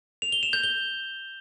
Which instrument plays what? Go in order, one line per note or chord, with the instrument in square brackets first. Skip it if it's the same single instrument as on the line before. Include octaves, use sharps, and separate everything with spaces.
[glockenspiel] F7
G7
E7
G6
G7